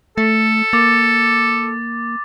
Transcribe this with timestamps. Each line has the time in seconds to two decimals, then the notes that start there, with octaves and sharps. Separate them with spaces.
0.18 A3 A4 A6
0.73 A#3 D6 A6